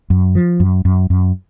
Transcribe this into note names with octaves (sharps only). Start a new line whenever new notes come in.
F#2
F3
F#2
F#2
F#2